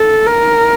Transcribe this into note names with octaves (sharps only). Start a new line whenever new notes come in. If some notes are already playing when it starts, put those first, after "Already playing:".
Already playing: A4
A#4